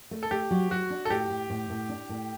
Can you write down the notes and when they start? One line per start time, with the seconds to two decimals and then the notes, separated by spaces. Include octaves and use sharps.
0.11 A3
0.23 A4
0.31 A3 G4
0.51 F#3
0.71 F#3 F#4
0.90 D4
1.05 A4
1.10 A2 G4
1.30 A2
1.50 A2
1.70 A2
1.89 D4
2.09 A2